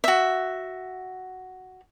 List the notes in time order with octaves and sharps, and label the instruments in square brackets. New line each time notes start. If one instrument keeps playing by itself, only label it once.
[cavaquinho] F#4 E5